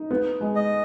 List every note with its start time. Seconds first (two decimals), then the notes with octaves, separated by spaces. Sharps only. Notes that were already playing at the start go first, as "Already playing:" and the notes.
Already playing: D#4
0.11 B3
0.41 G#3
0.55 D#5